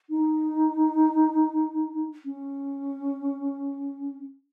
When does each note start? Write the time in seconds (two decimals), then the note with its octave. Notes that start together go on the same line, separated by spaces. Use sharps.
0.10 D#4
2.25 C#4